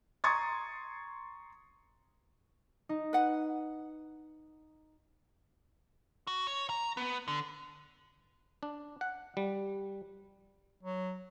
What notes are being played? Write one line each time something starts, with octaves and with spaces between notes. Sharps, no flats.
A#5 C6 C#6 D#6 G#6 A6
D#4
B4 F#5
F#4
C#5
A#5
B3
D3
D4
F#5
G3
F#3